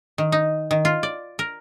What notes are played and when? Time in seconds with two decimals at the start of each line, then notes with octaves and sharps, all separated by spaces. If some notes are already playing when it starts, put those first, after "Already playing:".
0.18 D#3
0.32 D#4
0.71 D#3
0.85 F4
1.03 D5
1.39 A#4